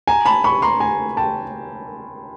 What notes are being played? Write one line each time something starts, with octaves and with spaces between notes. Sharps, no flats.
G#5 A#5
A5 B5
B5 C#6
A#5 C6
G#5 A#5
G5 A5